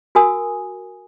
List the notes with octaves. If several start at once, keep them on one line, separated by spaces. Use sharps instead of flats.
F#4 A#4 G#5 D#6